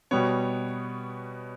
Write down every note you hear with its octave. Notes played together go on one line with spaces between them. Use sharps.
B2 G3 B3 C#5